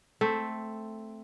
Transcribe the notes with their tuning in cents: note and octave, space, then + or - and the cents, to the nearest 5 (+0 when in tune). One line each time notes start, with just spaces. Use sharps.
A3 +0 C4 +0